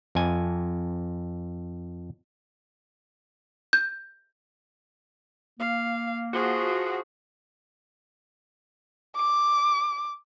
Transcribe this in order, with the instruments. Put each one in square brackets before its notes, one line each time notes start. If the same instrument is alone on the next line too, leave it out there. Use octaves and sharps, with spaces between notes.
[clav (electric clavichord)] F2 G#5
[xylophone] G6
[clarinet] A#3 [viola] F5
[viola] F3 G#4 [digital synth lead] F#4
[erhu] D6